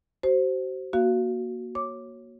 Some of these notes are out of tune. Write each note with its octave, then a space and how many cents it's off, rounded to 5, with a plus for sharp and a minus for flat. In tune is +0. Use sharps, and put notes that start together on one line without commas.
F#4 +40 C5 +0
A#3 +20 F#4 +0 F5 -25
C#5 -10 D6 +0